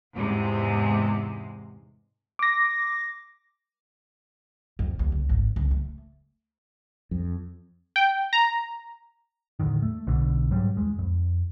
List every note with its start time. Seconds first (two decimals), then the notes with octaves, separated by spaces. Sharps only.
0.15 E2 G#2 C3 G#3
2.39 D6 A#6
4.79 F2
4.99 D#2
5.12 C#2
5.29 G#1
5.56 C#2
5.71 A3
7.11 F2
7.96 G5
8.33 A#5
9.60 E2 A2 D3 D#3
9.82 A3
10.07 B1 B2 D3
10.51 G#2 F#3 G3
10.77 E2 G#3
10.99 F2